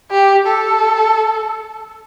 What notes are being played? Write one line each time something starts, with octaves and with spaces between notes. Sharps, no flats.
G4
A4